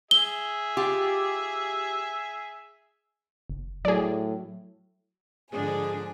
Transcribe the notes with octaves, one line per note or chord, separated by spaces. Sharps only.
G#4 E5 G7
F4 G4
F#1
A2 F#3 G#4 D5
G#2 D3 F3 D4 G#4 G#5